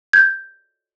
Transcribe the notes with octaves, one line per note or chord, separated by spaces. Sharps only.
G6 G#6